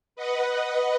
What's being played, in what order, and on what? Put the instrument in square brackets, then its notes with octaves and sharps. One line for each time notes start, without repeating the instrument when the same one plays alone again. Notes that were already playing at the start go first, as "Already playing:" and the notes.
[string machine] B4 D#5 F#5